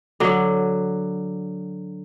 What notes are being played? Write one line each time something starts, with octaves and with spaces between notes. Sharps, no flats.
D3 F#3